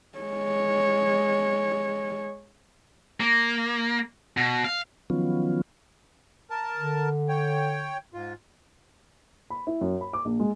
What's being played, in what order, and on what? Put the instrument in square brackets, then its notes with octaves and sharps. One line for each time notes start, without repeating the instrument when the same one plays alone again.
[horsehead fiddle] G#3 C#5
[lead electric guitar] A#3
B2
F5
[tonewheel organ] D#3 F3 F#3 B3 C#4 F4
[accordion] A#4 A5
[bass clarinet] D3
[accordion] C#5 G5
G#2 F4
[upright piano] B5
E4
F#2
B5
D6
A#1
G#3